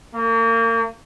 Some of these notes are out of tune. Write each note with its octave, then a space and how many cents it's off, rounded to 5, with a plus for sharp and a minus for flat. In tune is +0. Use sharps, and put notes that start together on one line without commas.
A#3 -35